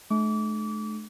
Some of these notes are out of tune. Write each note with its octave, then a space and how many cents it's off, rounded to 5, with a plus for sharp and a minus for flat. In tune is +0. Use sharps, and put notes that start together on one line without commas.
A3 -40 D4 +45 D6 -30